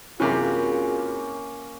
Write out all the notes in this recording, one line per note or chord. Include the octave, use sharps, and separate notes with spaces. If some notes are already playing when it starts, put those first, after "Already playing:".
F#2 C3 E3 A#3 C#4 F4 F#4 G#4